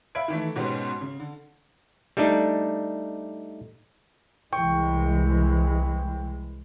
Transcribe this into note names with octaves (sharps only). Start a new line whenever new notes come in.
E5 F5 B5 G#6 D7
D#3 E3 A3
G#2 B2 G#3 B3 C#4 G4
C#3
D3
G3 A3 D4 D#4
C2 E3 G#3 G5 C#6